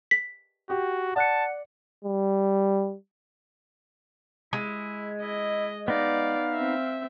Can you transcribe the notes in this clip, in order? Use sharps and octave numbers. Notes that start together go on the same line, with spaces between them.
B6
F#4 G4
D5 F#5 A5 F#6 C#7
G3
G#3 E4
E4 D#5
B3 D#4 D5 F5
C4 E5